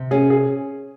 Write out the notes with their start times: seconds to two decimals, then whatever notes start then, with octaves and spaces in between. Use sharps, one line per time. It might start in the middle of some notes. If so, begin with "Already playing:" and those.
Already playing: C3
0.11 C#4 G#4
0.30 G#4